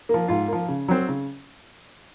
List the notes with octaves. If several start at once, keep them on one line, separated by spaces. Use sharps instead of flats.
F3 A#3
G#2 F4
F3 A#3
C#3
F#3 C4
C#3